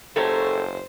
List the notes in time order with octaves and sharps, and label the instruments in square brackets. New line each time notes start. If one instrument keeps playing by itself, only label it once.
[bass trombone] F#1 [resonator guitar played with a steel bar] F#2 G4 A4 [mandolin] A3 C#5 A#5 [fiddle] C5